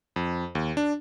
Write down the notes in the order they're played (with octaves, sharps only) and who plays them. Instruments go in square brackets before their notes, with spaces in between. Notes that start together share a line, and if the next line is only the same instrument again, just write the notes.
[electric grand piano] F2
D#2
D4